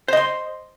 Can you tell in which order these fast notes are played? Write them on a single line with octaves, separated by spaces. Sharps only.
C5 D#5 C6